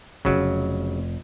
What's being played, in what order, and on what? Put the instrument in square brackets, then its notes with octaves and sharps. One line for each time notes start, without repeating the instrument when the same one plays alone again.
[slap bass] F1 F2 [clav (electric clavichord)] C#3 F#3